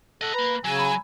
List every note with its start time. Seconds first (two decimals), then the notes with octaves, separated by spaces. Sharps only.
0.21 A4 D#5 F#5
0.34 A#3 B4 A#5
0.65 C#3 F#3 G#5 E6
0.78 A#5 B5